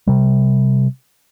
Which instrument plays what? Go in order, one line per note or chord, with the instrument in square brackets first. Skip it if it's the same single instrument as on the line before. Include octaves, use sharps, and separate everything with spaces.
[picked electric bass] C3 G3